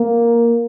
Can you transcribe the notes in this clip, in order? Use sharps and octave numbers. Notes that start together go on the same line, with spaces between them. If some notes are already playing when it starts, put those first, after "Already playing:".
Already playing: A#3